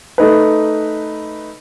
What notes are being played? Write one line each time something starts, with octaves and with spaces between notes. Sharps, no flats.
A3 D#4 B4